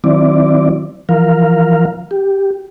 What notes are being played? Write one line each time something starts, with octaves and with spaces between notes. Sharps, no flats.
D#3 F#3 C4 E4 D5
E3 F3 A#4 F5
G4